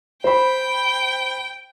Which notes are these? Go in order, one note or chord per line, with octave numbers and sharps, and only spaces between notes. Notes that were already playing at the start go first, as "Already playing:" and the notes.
C5 G5 B5